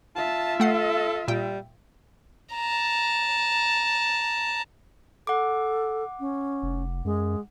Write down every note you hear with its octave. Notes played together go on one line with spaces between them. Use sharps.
F4 E5 A5
A3 A4 F#5 C7
A#2 G3 G5
A5 A#5
A4 F#5 D6
C#4
F1
F#2 G#3